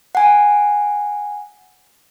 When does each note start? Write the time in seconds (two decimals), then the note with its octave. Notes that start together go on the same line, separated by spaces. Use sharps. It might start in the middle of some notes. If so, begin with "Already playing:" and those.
0.15 F#5 G#5